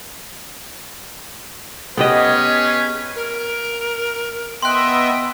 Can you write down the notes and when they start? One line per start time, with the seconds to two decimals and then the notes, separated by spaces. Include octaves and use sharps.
1.97 B3 C#4 G4 G#4 B4 D#5
3.16 A#4
4.62 B3 D#5 E5 G5 C6 F#6